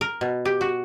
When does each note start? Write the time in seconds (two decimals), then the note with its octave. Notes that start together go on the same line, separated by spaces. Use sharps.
0.01 A#4
0.21 B2
0.45 G4
0.61 F#4